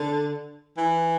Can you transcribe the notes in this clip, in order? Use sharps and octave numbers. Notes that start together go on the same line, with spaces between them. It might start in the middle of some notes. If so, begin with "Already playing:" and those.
Already playing: D3
E3